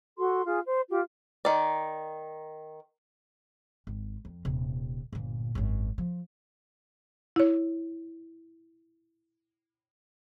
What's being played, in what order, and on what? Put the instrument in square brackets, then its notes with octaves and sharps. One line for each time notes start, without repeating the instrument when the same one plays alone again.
[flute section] F#4 A4 C6
F4 G#4
C5
F4 G4
[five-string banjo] D#3 D5
[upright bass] G#1
F2
D#1 C3
G1 A#2
G#1 F#2
F3
[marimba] E4 C#5